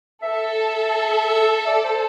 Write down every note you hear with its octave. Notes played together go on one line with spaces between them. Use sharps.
A4 E5
D5
C5